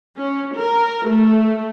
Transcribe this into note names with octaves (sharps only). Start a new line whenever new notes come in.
C#4
A#4
A3